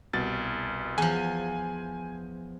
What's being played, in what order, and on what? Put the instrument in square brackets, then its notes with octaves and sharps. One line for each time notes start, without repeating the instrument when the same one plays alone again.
[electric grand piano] C2 B2 A6
[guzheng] E2 F3 [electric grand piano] G#5